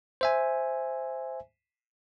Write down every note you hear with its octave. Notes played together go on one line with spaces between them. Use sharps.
C5 E5 G#5